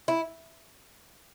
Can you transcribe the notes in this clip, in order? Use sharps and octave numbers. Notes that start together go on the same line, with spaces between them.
E4